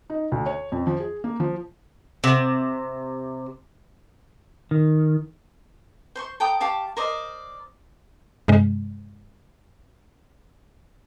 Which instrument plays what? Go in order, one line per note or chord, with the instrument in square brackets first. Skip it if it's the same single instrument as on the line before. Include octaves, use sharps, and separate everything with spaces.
[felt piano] D#4
D2
C#5
F2
F3
G#4
A#3
F3
[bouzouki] C3
[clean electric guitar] D#3
[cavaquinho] C5 C6 C#6
A4 G5 A#5 D#6
G4 F5 A5 C#6
A#4 C5 D5 D#5
[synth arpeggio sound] G2 C3 G#3